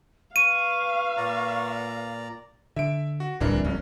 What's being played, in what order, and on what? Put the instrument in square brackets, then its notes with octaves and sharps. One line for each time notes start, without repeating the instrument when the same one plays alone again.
[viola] B4 F5 [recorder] C#6 [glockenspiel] D#7
[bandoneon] A#2 D5 A#5
[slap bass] D3 [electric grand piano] E5 D7
[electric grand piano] F#4
[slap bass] D1 C2 [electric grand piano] E3 D4 A#4
[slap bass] F1 C2 F2 [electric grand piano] C#4